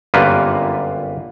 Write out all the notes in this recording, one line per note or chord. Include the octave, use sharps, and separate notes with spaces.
G1 F#2 G3 A#3 F4 B4